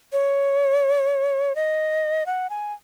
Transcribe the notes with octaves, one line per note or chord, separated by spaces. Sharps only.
C#5
D#5
F#5
G#5